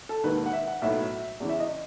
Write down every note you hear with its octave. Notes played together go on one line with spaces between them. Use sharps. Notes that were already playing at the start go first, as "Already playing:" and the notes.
A4
E1 D#2 D#3 B4
F#5
E5
F#5
B1 A2 F#3 B3 E5
E2 C#3 E3
E5
D#5